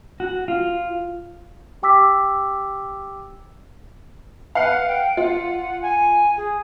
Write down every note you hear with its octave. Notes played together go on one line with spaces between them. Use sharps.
F#4
F4
G4 G5 D6 E6 B6
B4 F5 F#5
G5
F4 F#5
G#5
G#4